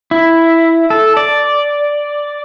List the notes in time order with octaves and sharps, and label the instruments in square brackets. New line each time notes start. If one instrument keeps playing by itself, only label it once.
[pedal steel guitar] E4
A4
D5